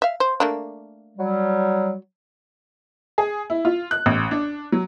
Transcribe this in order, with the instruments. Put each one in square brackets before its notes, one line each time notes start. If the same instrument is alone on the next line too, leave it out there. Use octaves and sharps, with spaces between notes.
[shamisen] E5 F5
C5
A3 A#3 D4
[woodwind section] F#3 G3
[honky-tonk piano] G#4
E4
F4
F#6
A1
D4
F#3